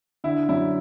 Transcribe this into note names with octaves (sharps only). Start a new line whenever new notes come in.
D3 E4
F#2 E4